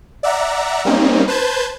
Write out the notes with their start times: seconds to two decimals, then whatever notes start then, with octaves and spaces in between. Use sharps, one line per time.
0.23 D5 E5 F#5 A#5
0.85 G3 A#3 C4 C#4 D#4
1.28 B4 C5 A5 G6 G#6